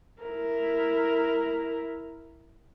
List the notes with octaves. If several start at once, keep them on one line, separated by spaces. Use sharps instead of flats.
E4 A#4